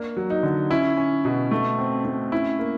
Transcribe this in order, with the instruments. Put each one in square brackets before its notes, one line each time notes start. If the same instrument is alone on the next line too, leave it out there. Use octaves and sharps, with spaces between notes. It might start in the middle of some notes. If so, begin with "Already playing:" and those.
Already playing: [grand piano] A#3 D4
F#3
D#4
D3
C#4 E4
C#4
B2
A3
C4
A3
C#4 E4
A#3